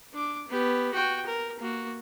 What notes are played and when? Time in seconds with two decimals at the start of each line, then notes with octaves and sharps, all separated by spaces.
0.13 D4 D6
0.48 B3 G4
0.93 F#4 G5
1.26 A#4
1.59 A#3 F#4